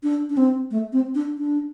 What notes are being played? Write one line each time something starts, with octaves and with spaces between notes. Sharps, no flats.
D4
D4
C4
A3
C4
D4
D4